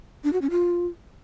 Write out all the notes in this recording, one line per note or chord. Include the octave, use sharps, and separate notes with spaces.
D4
F#4
C#4
F4